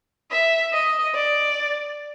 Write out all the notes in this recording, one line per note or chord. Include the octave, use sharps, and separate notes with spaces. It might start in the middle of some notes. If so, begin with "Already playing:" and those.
E5
D#5
D5